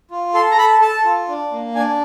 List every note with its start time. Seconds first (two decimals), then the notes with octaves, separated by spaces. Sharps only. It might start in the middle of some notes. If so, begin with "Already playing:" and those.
0.11 F4
0.34 A4 C6
0.51 A#5
0.57 A4 B5
0.81 A4 A5
1.05 F4
1.28 D4
1.52 A#3
1.75 D4 G#5